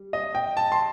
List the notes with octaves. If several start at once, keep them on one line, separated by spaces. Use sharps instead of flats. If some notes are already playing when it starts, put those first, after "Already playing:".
Already playing: G3
D#5
G5
A5
C6